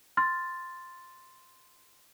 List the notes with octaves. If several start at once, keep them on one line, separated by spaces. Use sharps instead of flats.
C6 F6 A6